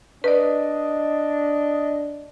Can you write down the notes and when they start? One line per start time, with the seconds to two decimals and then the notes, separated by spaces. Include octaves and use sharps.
0.24 D4 B4 D5 D#5